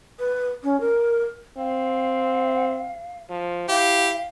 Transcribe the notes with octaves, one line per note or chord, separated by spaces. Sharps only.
B4
C#4
A#4
C4 F5
F3
E4 G4 F5